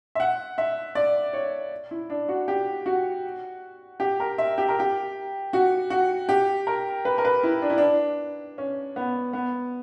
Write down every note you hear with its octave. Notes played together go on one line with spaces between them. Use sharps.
E5
F#5
E5
D5
C#5
E4
D4
F#4
G4
F#4
G4
A#4
E5
G4
A#4
G4
F#4
F#4
G4
A#4
B4
A#4
B4
E4
D4
E4
D4
C#4
B3
B3